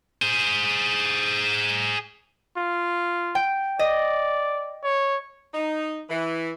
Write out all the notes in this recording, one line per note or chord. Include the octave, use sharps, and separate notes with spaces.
G#4 C5
F4
G5
D5 D#5
C#5
D#4
E3